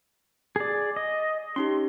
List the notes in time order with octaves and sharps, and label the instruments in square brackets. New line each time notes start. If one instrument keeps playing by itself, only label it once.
[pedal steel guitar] G#4 D5
D#5
[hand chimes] C#4 D#4 G4 [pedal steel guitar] C6